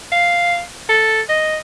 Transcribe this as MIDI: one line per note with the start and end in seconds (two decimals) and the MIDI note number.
0.12 0.61 77
0.89 1.21 69
1.29 1.57 75